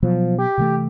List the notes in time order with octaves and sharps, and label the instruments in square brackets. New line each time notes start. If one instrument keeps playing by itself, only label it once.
[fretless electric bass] B2 F#3 B3 [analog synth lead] F3
[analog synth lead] G4
[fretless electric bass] C3 E3 A3